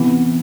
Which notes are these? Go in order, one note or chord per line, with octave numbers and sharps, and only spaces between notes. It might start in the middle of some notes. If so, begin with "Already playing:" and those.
Already playing: C3 E3 B3 E4